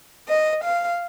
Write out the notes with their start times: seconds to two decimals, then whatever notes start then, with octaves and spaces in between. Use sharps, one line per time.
0.29 D#5
0.64 F5